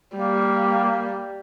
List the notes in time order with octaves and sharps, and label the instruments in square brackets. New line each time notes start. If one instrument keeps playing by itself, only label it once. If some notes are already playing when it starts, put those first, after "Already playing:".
[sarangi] G3 [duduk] A#3